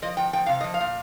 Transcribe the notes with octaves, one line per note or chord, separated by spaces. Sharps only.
F3 D#5
F3 G5
F3 G5
C3 F5
F3 D#5
F5
A#2